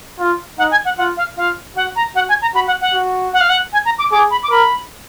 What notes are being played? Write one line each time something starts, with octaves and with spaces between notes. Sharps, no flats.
F4
D#4 F#5
G#5
F#5
F4 F#5
F5
F4 F5
F#4 F#5
A#5
F#4 F#5
G#5
A#5
F#4 B5
F#5
F#5
F#4
F#5
F5
F#5
G#5
A#5
D6
G#4 D6
B5
D6
A#4 B5